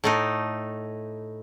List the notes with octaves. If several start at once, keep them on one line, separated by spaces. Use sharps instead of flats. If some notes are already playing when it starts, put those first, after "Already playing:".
A2 A3 D#4